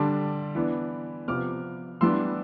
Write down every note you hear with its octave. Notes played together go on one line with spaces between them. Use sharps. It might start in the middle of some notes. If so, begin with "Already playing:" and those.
Already playing: D3 G3 D4 A5 C6
E3 B3 D4
C3 F3 B3 D6 F6
E3 G3 B3 D4 C6 E6